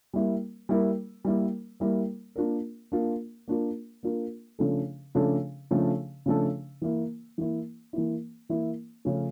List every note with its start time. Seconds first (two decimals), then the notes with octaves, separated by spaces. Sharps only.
0.14 G3 A#3 E4 A#4
0.69 G3 A#3 E4 A#4
1.25 G3 A#3 E4 A#4
1.80 G3 A#3 E4 A#4
2.36 A#3 D4 F4 A#4
2.92 A#3 D4 F4 A#4
3.48 A#3 D4 F4 A#4
4.03 A#3 D4 F4 A#4
4.59 C#3 F3 A3 D4 A4
5.15 C#3 F3 A3 D4 A4
5.71 C#3 F3 A3 D4 A4
6.26 C#3 F3 A3 D4 A4
6.82 E3 A#3 E4
7.38 E3 A#3 E4
7.93 E3 A#3 E4
8.49 E3 A#3 E4
9.05 C#3 F3 A3 C#4